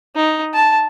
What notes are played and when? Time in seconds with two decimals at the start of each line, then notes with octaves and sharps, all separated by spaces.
0.16 D#4
0.53 A5